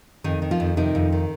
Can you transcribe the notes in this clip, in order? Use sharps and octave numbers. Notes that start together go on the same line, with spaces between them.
F2 D#3 D#4
D#3
F3 F4
F2
C3 D#3 D#4
F2
D#3